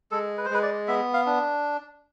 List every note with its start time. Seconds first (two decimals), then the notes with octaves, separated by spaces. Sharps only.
0.11 G#3 A4
0.38 B4
0.45 C5
0.50 G#3 B4
0.63 D5
0.87 B3 E5
1.13 F5
1.26 D4